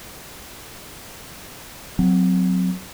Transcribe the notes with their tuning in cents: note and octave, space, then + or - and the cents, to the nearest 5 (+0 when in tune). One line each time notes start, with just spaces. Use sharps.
F#3 -10 C4 -20